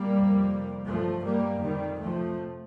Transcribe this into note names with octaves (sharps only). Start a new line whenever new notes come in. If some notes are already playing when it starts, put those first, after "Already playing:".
Already playing: G3 A#3
F2 C3
G2 F3 A3
G3 A#3
F2 C3 D#3 G3
F3 A3